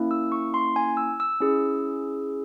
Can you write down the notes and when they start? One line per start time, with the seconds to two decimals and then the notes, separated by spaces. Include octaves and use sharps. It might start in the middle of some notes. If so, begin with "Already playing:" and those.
Already playing: A#3 C#4 E4
0.11 E6
0.32 C#6
0.54 C6
0.76 G#5
0.97 E6
1.20 E6
1.41 C#4 E4 G#4